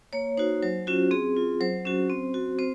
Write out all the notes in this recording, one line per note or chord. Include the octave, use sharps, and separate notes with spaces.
A#3 C#5
D#4 F#4 C5
F#3 C5
C#4 F4 F#4
C4 G#4
F4
F#3 C5
C#4 F#4
C4
F#4
C4 C5